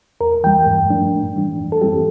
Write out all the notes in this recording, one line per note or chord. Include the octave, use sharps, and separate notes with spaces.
E2 A#4
E3 G3 G5
G2
F3 A3 D4
A2
E3 G3 D4
F2
A4
E3 G3 C4 E4 G4